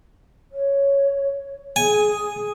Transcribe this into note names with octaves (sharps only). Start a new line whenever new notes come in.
C#5
G#4 G#5